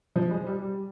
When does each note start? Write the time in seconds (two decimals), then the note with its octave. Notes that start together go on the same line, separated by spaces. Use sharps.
0.16 F3
0.31 G#3
0.47 G3
0.62 G3